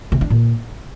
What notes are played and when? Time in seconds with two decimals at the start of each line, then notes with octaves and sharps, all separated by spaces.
0.12 C3
0.21 D4
0.30 A#2